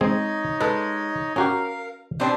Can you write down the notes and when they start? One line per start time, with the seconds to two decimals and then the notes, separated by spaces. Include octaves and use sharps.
0.01 G#3 C4 D#4 G#4 C#5 D#5
0.60 G#3 A4 B4
1.36 C#4 F#4 G4 A#4 F5
2.20 B2 C4 D4 G4 C5